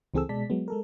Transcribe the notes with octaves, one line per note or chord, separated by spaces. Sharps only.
C#2 E3 C4 G#4 A4 E6
B2 G#3 D5 A5 B6
F#3 G#3 B3
G#3 A4 A#4